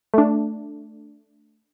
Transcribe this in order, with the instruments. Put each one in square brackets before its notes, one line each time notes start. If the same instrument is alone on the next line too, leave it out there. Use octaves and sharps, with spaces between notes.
[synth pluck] A3 D4